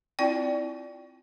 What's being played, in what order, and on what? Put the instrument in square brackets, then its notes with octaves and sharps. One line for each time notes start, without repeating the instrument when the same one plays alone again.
[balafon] C4 E4 F4 D5 G5